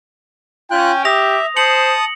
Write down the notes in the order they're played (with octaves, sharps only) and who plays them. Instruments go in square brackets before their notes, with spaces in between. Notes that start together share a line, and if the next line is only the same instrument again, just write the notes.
[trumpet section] C#4 G5 [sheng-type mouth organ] F4 F#6
[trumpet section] G4 [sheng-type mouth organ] E5 [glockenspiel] D#6 A#6 F7
[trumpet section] C5 [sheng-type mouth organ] A5 D#6 [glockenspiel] C#7 F#7